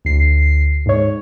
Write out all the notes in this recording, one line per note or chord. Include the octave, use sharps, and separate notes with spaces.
D2 C7
G#2 C#5